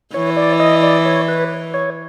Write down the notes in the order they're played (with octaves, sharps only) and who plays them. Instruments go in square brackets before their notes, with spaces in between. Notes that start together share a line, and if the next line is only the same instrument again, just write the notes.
[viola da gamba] E3 [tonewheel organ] C#5
[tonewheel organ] D5
D#5
D5
C#5
B4
C#5